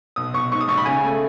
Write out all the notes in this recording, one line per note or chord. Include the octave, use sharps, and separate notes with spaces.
B1 D#6
B1 C#6
G#2 C#6
D#6
G#1 C#6
B5
C#3 G#5
A3